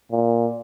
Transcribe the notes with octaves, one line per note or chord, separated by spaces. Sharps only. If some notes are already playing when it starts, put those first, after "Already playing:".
A#2